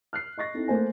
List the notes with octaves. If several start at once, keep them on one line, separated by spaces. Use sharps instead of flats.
F6 F#6 C7
D#5 C#6 A6 A#6
C4 D#4 E4 A4
A3 A#3 C5 G#5